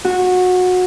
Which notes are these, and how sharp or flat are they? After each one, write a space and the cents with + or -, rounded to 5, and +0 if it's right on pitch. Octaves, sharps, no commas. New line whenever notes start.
F#4 -20